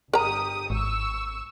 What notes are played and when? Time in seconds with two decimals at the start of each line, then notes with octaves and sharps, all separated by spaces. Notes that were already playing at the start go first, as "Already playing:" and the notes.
0.13 G1 G4 A#4 A#5 D#6
0.70 G#1 C#6 E6